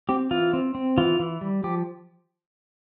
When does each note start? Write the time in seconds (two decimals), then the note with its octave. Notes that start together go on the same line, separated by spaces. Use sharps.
0.09 C4 G4
0.31 E3 F4
0.53 C4
0.75 C4
0.98 E3 F4
1.20 E3
1.41 G3
1.64 F3 G4